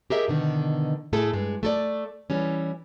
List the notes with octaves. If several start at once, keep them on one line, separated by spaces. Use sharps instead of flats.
G4 G#4 A#4 D#5 E5
B2 D3 D#3
A2 A3 E4 G#4 A4
G2 G#3
A3 A4 D5
E3 G3 C#4